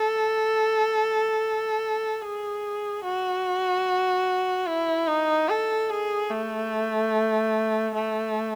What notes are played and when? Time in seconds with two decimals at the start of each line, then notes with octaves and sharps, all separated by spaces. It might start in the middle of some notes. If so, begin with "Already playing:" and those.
Already playing: A4
2.22 G#4
3.04 F#4
4.67 E4
5.08 D#4
5.49 A4
5.90 G#4
6.31 A3
7.94 A3